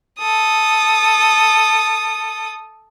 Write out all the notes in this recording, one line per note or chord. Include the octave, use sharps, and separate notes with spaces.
A4 D#6